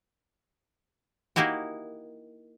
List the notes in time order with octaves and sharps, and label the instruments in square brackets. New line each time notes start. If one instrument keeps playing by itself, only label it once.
[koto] A#3 D#4 E4 F#4 G4